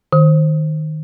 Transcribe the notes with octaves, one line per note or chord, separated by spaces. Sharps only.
D#3